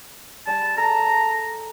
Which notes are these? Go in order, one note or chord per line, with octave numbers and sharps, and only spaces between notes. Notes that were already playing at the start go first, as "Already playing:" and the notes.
G3 G#5 A5
A4 A#5